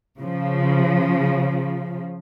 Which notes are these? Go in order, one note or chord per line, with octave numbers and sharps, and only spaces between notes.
C#3 F3